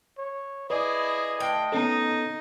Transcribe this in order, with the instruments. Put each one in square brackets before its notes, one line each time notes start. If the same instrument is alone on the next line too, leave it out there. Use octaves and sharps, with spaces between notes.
[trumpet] C#5
[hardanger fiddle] E4 G#4 [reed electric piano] B4 D5 D6 [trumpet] D#5
[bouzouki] A2 [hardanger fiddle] G5
[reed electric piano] B3 C#4 A4 [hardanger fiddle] D#4